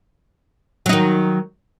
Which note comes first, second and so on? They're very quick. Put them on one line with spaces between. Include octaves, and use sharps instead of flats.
F#3 D#4 D#3